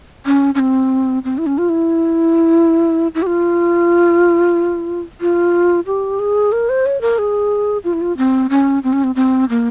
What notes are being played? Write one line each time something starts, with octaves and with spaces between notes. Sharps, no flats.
C#4
C#4
C4
C4
E4
C#4
F4
E4
E4
G4
F4
F4
G4
G#4
A#4
C5
C#5
A#4
G#4
F4
E4
F4
C4
C#4
C4
C#4
C4
C4
A#3